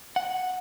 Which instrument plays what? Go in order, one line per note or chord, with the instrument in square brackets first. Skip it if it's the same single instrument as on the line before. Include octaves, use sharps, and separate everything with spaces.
[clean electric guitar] F#5